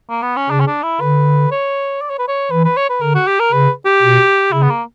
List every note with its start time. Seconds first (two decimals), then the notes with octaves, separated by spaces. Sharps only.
0.09 A#3
0.22 B3
0.36 C#4
0.50 C#3 D4
0.60 C#4
0.67 D4
0.83 E4
1.00 D3 B4
1.51 C#5
2.02 D5
2.10 C#5
2.19 B4
2.28 C#5
2.51 E3 B4
2.65 B4
2.77 C#5
2.89 B4
3.01 D3 A#4
3.15 F#4
3.27 G4
3.40 A#4
3.53 C#3 B4
3.86 G4
4.02 B2
4.52 C#3 E4
4.62 B3
4.70 A#3